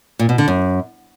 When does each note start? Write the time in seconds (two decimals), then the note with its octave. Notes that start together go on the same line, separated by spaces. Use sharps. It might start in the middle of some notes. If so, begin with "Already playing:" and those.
0.19 A#2
0.29 B2
0.38 D3
0.48 F#2